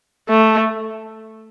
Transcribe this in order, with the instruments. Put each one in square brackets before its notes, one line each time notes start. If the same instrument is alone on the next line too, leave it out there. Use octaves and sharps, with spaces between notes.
[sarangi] A3